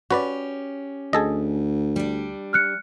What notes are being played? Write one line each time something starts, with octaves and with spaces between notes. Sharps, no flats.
C#4 F#4 G4 B4 D5
D2 G#4 A4 D#5
G3 D4
F6 F#6 C#7